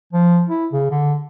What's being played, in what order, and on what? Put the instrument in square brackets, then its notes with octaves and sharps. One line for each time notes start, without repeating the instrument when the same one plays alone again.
[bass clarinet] F3
E4
C#3
D3